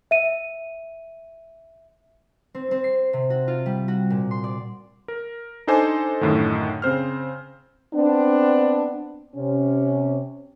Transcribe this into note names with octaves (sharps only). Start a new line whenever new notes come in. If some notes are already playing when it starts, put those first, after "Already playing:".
E5 D#7
C4
C4
C7
C3
F#4
F4
G3
F#4
A#2
C6
D5
A#4
D4 D#4 A4 C5 G#5 D6
F#2 A2 D3 D#3
C#3 C4 C5 F6
B3 C4 D4
C3 C#4